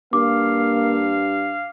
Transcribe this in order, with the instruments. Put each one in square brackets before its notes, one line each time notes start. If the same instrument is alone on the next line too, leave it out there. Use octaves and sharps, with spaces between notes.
[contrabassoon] G2 [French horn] A#3 [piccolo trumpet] F5 [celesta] D6